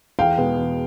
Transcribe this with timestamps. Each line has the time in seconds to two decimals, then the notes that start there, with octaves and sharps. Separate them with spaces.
0.19 E2 F5 G5
0.38 B2 G#3 B3
0.58 E2